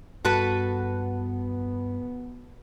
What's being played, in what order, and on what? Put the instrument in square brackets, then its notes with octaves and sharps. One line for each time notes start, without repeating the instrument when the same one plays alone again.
[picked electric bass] G2 [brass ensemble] B3 [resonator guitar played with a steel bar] F#4 A4 B4